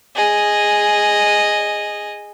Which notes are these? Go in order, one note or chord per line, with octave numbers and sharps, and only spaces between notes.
G#4 D#5